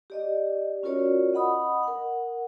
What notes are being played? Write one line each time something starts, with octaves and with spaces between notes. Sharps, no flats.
G4 D5 D#5
C#4 F4 F#4 A#4 C#5 D5
D#5 F#5 B5 D#6
A#4 F#5